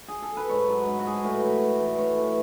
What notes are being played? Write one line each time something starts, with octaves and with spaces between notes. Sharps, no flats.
G#4
A4
B4
G#2 C#5
F#3
G#2
F#4
F#3 G#4
A4
A2 B4
E3
A2
E3
D5
A2 C#5
E3